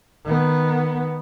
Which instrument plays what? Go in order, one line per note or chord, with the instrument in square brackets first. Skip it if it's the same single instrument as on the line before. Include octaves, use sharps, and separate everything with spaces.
[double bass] D#3 B3